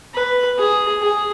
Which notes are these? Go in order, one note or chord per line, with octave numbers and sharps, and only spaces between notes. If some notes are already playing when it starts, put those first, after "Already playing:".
B4
G#4
G#4